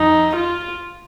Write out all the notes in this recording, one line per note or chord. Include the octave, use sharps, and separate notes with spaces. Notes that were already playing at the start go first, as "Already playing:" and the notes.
Already playing: F2 D#3 D#4
F4